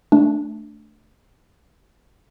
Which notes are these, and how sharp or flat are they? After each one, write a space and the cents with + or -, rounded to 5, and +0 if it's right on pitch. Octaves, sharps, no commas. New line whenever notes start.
A3 +0 D4 +0